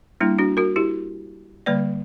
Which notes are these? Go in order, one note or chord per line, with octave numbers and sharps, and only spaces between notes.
G3 A#3 D4 E4
D4 F#4
F#4 A#4
E4 G4
D3 G3 A#3 B4 D5